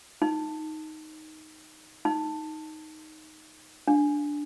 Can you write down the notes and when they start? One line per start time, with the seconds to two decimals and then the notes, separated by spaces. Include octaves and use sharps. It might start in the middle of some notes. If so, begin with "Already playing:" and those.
0.22 D#4
2.05 D#4
3.88 D4